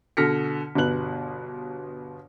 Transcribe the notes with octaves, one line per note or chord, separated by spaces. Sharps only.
B2 D3 F6 A#6 B6 C#7
G1 G2 B2 B3 F#6 F#7